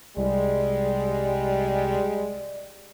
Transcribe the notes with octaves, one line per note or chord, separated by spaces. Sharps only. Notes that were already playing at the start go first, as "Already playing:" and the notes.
C2 G3 G#3 D5